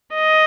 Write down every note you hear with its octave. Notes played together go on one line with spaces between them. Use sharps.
D#5